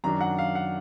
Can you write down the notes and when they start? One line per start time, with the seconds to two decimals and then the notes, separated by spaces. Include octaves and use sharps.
0.04 F#2 D#3 F#3 D4 A#5
0.21 F#5
0.39 F5
0.55 F#5